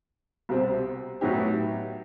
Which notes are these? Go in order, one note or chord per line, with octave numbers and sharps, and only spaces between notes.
C2 B2 G3 C4
A2 F#3 B3 D#4 G4